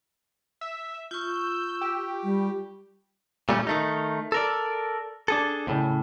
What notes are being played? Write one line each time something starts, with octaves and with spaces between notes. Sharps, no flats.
E5
F4 C#6 E6 G6
G4
G3
A#2 G3 A3 C#4
D#3 A3 D#4
A4 A#4 D5
D4 G#4 A4
D#2 A2 C#3